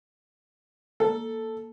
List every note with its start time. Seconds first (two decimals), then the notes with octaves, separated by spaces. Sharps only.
1.00 A#3 A4